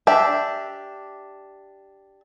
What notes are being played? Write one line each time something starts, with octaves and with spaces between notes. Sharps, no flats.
D4 G4 E5